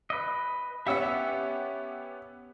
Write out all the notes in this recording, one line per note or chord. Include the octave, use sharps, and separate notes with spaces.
B4 D#5
B3 C#4 G4 E5 F#5 E6